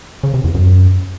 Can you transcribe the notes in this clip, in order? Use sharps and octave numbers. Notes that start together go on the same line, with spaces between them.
C#3
C3
E2
F#2